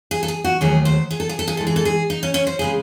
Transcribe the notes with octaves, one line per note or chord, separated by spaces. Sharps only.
G#4
A4
G#4
F#4
D#2 D#3 F#3 A3 G#4
C5
G#4
A4
G#4
A4
G#4
G#2 E3 G#3 A4
G#4
A4
G#4
D#4
C#4
C#4
C5
C#3 G#3 G#4